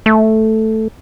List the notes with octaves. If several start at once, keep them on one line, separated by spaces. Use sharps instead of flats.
A3